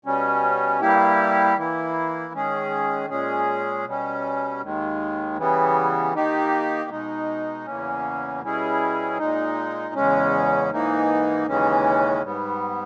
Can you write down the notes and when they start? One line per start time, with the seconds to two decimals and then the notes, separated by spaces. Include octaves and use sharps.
0.05 B2 G3 C#4
0.81 G2 G3 A#3 E4 G4
1.57 E3 A#3 E4
2.34 D#3 G#3 C#4 G#4
3.09 A#2 G#3 C#4 G#4
3.85 B2 G3 C#4
4.62 D#2 D#3 G#3
5.37 C#3 E3 G3 B3
6.14 D#3 A#3 D#4 G4
6.90 B2 G#3 D#4
7.65 E2 C#3 E3 A#3 C#4
8.42 B2 G3 C#4 E4 G#4
9.18 A#2 G#3 D#4
9.95 E2 C#3 G#3 C#4
10.70 G#2 E3 A#3 D#4
11.46 D#2 C#3 E3 G#3 C#4
12.23 G#2 G3 B3